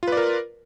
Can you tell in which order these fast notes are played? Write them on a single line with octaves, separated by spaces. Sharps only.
F4 B4 D5 A#4